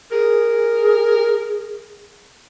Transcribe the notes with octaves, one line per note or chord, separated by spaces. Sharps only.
G#4 A#4